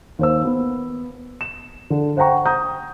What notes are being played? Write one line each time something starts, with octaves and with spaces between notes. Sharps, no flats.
D#2 C5 E6
B3
E7
D3
C5 F#5 G5 A#5 C#6
A#5 D#6 G6